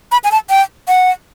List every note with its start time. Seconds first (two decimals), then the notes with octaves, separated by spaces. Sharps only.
0.12 B5
0.24 G#5
0.32 A5
0.50 G5
0.88 F#5